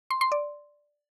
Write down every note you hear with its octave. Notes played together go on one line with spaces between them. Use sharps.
C6
C6
D5